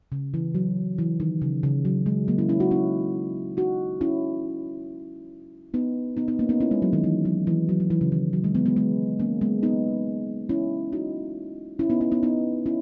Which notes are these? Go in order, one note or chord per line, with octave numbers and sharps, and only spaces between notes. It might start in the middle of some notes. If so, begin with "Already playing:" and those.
C#3
E3
F#3
E3
D#3
C#3
C#3
F#3
G#3
F#3 A#3
C#4 E4
C#4 E4
D#4 F#4
C#4 E4
D#4 F#4
C#4 E4
B3 D#4
B3 D#4
B3 D#4
A#3 C#4
B3 D#4
C#4 E4
G#3
F#3
D#3
E3
F#3
E3
F#3
F#3
E3
C#3
D#3
F#3
G#3
G#3 B3
G#3 B3
G#3 B3
A#3 C#4
G#3 B3
B3 D#4
C#4 E4
D#4 F#4
C#4 E4
B3 D#4
C#4 E4
B3 D#4
B3 D#4
C#4 E4